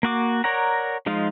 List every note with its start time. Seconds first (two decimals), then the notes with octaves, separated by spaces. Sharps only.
0.03 A#3 F#4 D6
0.44 A#4 C#5 D5 F#5 A#5
1.06 F3 G#3 D#4 F4